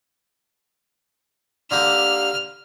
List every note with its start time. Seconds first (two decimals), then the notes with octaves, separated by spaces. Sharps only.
1.71 D3 A#3 G4 F6